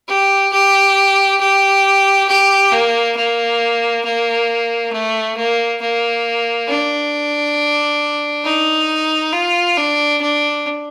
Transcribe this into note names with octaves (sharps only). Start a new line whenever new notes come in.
G4
G4
G4
G4
A#3
A#3
A#3
A3
A#3
A#3
D4
D#4
F4
D4
D4